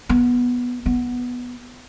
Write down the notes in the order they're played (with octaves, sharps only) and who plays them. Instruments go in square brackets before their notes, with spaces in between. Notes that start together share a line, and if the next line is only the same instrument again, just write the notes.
[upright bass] B3
B3